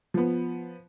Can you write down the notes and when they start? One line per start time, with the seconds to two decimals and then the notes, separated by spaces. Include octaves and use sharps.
0.14 F3 B3